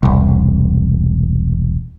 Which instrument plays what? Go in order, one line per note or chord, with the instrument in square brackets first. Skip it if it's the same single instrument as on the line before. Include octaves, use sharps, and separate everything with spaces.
[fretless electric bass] E1 C2